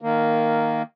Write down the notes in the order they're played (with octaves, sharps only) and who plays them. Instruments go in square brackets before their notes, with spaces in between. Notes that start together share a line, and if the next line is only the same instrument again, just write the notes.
[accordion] D#3 A#3